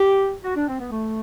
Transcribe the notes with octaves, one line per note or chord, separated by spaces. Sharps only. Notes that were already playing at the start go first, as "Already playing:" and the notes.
Already playing: G4
F#4
D4
C4
B3
A3